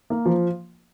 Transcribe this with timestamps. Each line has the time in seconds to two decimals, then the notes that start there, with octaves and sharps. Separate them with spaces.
0.10 A#3
0.26 F3